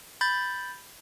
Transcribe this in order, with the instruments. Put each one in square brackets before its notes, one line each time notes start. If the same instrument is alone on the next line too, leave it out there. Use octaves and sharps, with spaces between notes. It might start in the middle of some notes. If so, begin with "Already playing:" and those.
[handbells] B5 G6 A6